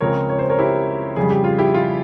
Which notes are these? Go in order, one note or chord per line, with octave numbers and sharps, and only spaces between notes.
C#2 C#3 F3 G#3 C4 A#4 C#5
C#5
C5
A#4 C#5
E4 G4
F2 C#3 G3 G#4
G4
F4
E4 G4
F4